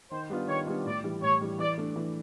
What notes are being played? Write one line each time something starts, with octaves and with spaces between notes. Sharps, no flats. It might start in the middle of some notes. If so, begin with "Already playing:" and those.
D#3 C5
G3 B3 D4 F4
D#3 C#5
G3 B3 D4 F4
A2 D5
E3 G3
A2 C#5
E3 G3
E3 D5
A3 D4
E3